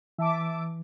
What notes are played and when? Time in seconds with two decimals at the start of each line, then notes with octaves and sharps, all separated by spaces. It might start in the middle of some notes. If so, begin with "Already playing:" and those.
0.19 E3 E5 A5 D6